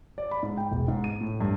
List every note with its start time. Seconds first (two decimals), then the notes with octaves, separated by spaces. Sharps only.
0.18 D5
0.31 B5
0.43 G#2
0.57 G5
0.72 E1
0.88 G#2
1.04 D#7
1.20 A2
1.40 G2